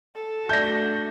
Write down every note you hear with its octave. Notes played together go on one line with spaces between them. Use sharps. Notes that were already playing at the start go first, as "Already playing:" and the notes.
A4
A3 D4 F#4 D5 E5 A5 G6 A#6